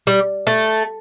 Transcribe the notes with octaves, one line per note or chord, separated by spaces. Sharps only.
G3
A3